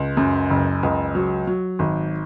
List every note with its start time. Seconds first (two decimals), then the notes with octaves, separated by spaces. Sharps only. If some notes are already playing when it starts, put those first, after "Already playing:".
Already playing: C#2
0.17 F#2
0.50 F#1
0.83 C#2
1.15 F#3
1.47 F#3
1.79 G#1